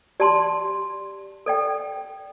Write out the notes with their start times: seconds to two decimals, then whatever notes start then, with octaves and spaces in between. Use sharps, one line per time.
0.20 G4 D5 A5 C6
1.46 A4 D5 G5